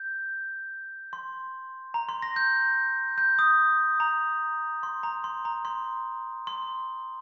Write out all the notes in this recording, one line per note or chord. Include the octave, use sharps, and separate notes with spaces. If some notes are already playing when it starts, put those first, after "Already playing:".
Already playing: G6
C6
A#5
C6
A#6
G6
G6
D#6
A#5
C6
A#5
C6
A#5
C6
C6